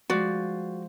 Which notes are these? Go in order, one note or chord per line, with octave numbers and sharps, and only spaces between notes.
F3 G#3 F#4 D5